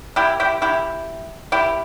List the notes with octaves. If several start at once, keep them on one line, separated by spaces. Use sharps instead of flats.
E4 G4
E4 G4
E4 G4
E4 G4